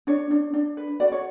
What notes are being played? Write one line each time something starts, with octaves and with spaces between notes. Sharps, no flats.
D4 C#5
D4
D4
B4
F#4 D5
C#5